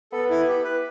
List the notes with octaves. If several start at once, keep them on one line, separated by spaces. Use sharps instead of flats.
B3 A4
E4
G4
B4